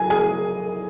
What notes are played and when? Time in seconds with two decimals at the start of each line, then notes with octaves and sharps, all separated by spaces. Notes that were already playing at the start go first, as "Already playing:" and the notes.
Already playing: F#3 G#5
0.10 G#4 G#5